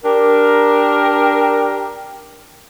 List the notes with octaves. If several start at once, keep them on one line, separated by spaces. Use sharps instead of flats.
D4 G4 A#4